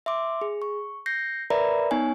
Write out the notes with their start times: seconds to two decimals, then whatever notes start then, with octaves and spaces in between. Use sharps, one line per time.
0.06 E5 C6 D6
0.41 G#4
0.62 C#6
1.06 G6 A#6 C7 C#7
1.50 A#4 B4 D5 E5 A#5 B5
1.91 B3 D#4 C#5 G#5